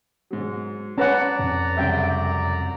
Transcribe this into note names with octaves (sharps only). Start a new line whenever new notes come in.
G#2 F#3
C#4 B4 D5 F#5 A5 A#5
F2
C2 F#2 C#3 E5 G5